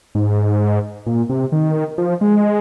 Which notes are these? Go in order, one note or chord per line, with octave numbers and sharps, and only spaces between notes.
G#2
A#2
C3
D#3
F3
G#3